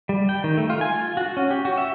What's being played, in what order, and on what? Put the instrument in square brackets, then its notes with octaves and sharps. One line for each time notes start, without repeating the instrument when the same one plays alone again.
[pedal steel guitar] G3
G5
D#3
A3
F4
G#5
F4
F#4
C#4
G4
F#4
E5